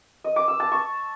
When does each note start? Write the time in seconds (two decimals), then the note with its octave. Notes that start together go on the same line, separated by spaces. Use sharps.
0.24 D#5
0.36 D6
0.48 E6
0.60 A5
0.72 C#6